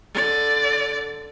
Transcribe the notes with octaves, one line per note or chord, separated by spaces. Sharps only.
D3 D5